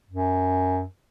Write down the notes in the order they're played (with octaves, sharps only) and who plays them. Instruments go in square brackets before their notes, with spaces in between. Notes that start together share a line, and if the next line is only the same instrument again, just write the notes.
[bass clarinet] F#2